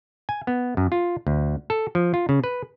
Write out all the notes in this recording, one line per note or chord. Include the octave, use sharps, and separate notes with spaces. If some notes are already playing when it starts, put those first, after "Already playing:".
G#5
B3
F#2
F4
D2
A4
F3
F4
C#3
B4